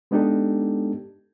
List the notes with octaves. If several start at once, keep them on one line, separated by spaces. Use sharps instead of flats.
G#3 B3 D4 D#4 G4 A4